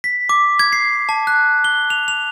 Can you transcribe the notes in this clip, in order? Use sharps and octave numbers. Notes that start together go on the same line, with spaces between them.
B6
D6
G#6
C7
A5
F#6
G7
F7
F7